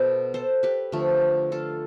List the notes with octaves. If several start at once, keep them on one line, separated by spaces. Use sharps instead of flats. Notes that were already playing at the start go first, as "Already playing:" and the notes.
Already playing: B2 B3 A4 C5
A4 C5
G4 B4
D3 F3 A3
F4 A4